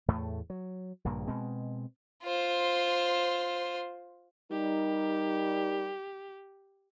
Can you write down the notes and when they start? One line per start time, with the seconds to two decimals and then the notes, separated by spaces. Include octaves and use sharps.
0.08 E2 A2 A3
0.50 F#3
1.05 A#1 G2 C#3 A#3
1.27 B2 G#3 C4
2.24 F4 C5
4.51 G3 D#4 G4 A#4